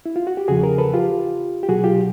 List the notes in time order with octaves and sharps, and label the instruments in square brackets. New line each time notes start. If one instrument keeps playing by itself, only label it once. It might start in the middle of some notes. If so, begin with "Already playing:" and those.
[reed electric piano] E4
F4
F#4
G4
E2 C#3 F3 F#4 G#4
G#4 A#4
A4 B4
F4 G4
G4
C2 B2 F#3 F#4 G#4
F4 G4